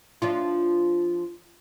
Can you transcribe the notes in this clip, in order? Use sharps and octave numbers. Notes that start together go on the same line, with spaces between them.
F3 D4 F4